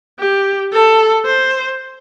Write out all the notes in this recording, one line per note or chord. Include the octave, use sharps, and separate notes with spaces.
G4
A4
C5